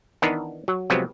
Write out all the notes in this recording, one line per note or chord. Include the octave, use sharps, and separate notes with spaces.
D#3 E3 B3 D4 D#4
F#3
C3 F3 F#3 G#3 B3 C4